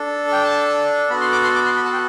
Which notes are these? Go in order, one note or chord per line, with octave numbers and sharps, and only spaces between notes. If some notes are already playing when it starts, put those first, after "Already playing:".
Already playing: D4 A4
G5
A5
B3 F#4 A4 B5
C6
D6
C6
D6
C6
B5
A5
G5